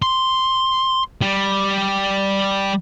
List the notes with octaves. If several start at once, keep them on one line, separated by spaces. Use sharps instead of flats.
C6
G3